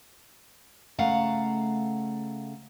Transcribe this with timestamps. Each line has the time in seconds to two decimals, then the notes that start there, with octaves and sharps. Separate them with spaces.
0.98 C#3 A3 F5 F#5 A#5